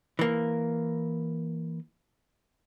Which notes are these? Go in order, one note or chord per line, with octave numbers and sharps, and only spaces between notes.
E3 A#3